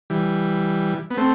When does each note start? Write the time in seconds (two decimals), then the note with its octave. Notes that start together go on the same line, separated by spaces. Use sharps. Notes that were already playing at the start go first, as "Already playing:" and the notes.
0.10 E3 G3
1.11 B3
1.17 A3 C4